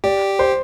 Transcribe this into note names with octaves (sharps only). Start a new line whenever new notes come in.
G4 D5
C5